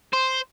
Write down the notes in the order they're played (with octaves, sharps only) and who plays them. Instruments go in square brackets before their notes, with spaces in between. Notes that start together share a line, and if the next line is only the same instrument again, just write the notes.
[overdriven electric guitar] C5